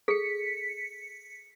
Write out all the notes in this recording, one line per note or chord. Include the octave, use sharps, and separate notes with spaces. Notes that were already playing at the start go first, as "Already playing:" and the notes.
G#4 A4 B6 C#7